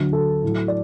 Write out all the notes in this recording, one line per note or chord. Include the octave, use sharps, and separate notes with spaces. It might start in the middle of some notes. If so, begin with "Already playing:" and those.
Already playing: D2 D3 F#3
A4
A2
F#3
D5